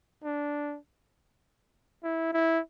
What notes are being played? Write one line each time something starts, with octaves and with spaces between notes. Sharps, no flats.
D4
E4
E4